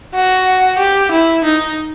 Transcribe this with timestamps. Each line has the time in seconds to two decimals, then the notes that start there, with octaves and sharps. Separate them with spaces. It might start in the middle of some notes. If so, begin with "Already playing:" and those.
0.14 F#4
0.78 G4
1.11 E4
1.44 D#4